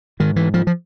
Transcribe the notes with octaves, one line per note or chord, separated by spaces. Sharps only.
G#2 D#3
E3
F3
F3